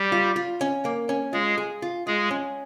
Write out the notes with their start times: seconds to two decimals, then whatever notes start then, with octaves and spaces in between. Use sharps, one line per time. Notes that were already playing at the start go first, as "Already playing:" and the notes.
Already playing: G3 G4
0.12 F4
0.36 F4
0.61 C#4
0.85 A#3
1.09 C#4
1.33 G#3 F4 G#4
1.58 G#4
1.82 F4
2.07 G#3 F4 G#4
2.31 C#4